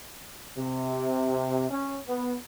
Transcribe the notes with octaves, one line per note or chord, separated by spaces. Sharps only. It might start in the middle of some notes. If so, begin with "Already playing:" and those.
C3
C#4
B3